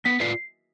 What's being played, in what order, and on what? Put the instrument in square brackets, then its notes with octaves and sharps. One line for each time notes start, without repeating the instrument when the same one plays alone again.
[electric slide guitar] B3 [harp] B6
[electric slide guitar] F4 B4 D5 [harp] C7